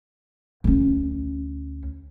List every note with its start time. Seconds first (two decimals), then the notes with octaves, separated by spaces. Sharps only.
0.64 D2 C#4